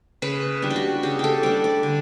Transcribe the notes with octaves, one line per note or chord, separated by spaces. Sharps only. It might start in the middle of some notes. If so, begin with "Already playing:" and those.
C#3 B4
G3 D4
G4
F#4
C#3 G4
G4 A4
G3 D4 D5
D5
D3